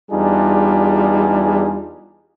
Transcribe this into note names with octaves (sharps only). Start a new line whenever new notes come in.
E2 G3 D4 D#4 F4 G#4